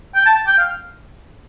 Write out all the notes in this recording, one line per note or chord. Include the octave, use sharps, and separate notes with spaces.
G5
A5
G5
F5